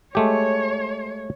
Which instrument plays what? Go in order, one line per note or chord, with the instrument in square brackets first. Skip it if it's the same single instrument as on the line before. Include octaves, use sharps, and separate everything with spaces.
[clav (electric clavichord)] G#3 A3 G4 [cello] C#5